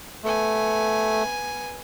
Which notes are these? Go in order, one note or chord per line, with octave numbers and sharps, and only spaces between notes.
A3 B3 G#5